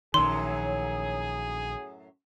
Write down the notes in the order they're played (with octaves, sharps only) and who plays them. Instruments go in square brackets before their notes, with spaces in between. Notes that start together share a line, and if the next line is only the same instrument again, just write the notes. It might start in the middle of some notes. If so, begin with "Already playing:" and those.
[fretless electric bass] A#1 D#3 [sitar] F#2 A2 F#3 [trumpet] G#4 [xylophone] C6